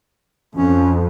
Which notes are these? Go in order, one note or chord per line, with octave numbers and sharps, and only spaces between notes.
F2 C#4